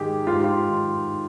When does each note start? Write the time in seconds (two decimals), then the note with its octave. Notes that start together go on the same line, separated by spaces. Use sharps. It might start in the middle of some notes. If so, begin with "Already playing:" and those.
Already playing: G#2 D#3 G4 G#4
0.27 G#2 F4
0.35 G4
0.44 F4
0.68 D#3